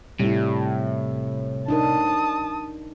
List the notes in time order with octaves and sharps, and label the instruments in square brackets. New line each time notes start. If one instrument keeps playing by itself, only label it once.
[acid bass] A2 [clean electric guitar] C3 [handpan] G3 E4
[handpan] D4 D#4 A#4 [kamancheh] A5 D#6